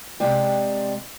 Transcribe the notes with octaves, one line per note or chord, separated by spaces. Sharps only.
C3 G#3 D5 G5